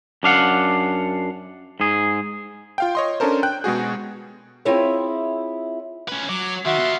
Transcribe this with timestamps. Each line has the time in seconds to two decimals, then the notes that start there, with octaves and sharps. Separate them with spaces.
0.23 F#2 D4 F5 F#5
1.80 G#2 G#4
2.78 F4 F5 G5
2.95 C#5 D#5 C6
3.20 C#4 D4 A4 A#4 C5
3.43 G5 F#6 G6
3.64 B2 G#3 F#4 G#4
4.65 C4 E4 F4 G#4 C#5 E5
6.08 C#4 B4
6.29 F#3 D6
6.65 D#3 F#4 E5 C6
6.78 B3 F4